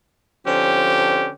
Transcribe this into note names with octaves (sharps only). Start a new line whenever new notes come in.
D3 F3 C4 C#4 G4